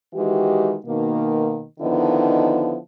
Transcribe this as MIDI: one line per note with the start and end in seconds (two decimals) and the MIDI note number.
0.14 0.75 51
0.14 0.75 52
0.14 0.75 56
0.14 0.75 66
0.14 0.75 67
0.86 1.63 47
0.86 1.63 51
0.86 1.63 58
1.80 2.76 50
1.80 2.76 51
1.80 2.76 53
1.80 2.76 59
1.80 2.76 63
1.80 2.76 64